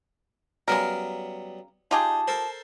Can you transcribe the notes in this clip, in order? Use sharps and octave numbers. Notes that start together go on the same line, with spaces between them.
C#3 F#3 G3 B3 A#4
D#4 F4 G4 G#4 A5
A4 A#4 C5